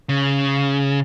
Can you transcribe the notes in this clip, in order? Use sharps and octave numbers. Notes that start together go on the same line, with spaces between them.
C#3